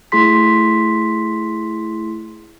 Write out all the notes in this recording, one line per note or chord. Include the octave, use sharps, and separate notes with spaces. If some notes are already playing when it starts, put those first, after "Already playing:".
A3 E4 G#4 C6 B6